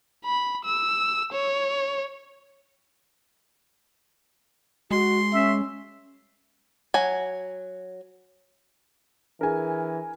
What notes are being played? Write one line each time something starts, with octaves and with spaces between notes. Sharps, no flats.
B5
E6
C#5
G#3 F#4 C6
C#4 E5
F#3 G#5
E3 D4 G#4 A#4 G#5